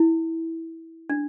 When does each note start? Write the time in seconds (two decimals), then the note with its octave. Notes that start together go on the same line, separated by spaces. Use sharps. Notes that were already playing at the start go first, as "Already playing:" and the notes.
Already playing: E4
1.09 D4